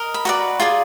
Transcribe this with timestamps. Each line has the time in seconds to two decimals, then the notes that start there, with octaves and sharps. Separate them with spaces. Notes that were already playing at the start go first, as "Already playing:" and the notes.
Already playing: A#4 D#5
0.14 B5
0.25 F#4 B4 D5 A#5
0.60 F4 G#4 D5